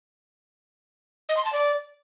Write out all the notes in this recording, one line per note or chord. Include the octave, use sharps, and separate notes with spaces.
D#5
C6
A5
D5